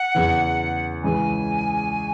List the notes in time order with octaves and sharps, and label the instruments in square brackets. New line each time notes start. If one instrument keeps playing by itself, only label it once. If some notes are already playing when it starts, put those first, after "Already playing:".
Already playing: [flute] F#5
[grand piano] E2 C#3 E3
[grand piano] C#2 C#3 E3 [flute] G#5